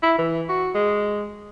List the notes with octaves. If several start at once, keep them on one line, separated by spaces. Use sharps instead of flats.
E4
E3
F#4
G#3